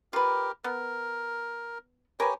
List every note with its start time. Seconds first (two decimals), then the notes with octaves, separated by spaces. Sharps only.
0.13 F4 G4 A#4 B4
0.64 B3 A#4
2.20 G4 A#4 B4 C#5 G#5